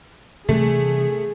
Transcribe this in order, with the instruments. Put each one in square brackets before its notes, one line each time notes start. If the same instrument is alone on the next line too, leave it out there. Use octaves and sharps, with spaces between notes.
[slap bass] C3 E3 G3 [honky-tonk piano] A3 [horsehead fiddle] G#4